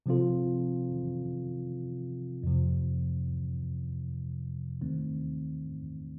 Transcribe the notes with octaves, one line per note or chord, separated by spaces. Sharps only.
C3 F3 C4 F4 A4
F2 C3 F3
D#2 D#3 A3 C4